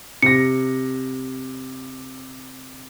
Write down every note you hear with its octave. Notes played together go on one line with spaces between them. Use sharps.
C3 A#6 C#7